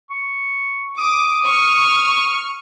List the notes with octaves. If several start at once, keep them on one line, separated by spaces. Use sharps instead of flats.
C#6
D6 D#6
C#6 F6